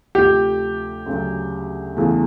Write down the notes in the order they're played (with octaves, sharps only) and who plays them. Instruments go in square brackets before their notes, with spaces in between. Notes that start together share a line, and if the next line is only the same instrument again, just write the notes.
[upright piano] D2 C3 F3 A3 [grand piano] G4
[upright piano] D2 C#3 F#3
E2 C#3 E3 A3